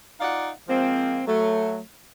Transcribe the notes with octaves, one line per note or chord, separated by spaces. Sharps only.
D#4 F4 D5 F5 F#5
F3 G#3 A#3 C4
F#3 A3